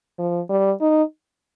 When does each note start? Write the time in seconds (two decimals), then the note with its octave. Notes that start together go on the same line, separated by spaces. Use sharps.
0.18 F3
0.49 G3
0.81 D#4